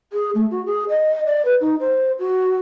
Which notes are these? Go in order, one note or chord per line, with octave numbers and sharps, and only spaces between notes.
G#4
A3
F#4
G#4
D#5
D5
B4
D#4
C5
F#4